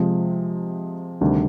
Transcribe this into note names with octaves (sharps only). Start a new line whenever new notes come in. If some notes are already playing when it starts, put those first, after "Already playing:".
Already playing: C3 F3 G#3
D2 C3 D#3 G3 D4